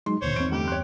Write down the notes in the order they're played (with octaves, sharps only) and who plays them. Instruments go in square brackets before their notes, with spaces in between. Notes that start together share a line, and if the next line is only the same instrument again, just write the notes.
[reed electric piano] F#3 G#3 D#4 [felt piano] C6
[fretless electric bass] D1 [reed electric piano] E2 A#2 D3 [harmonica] C5 C#5
[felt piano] G#1 D7 [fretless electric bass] E2 C4 [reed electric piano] C#6
[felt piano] G1 [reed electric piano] A3 [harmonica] G4
[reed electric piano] G2 F#6 [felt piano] C#5 G5 C6